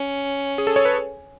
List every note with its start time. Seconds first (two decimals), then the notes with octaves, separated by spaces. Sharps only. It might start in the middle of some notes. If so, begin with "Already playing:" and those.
Already playing: C#4
0.58 G#4
0.67 A4
0.76 C#5
0.85 B4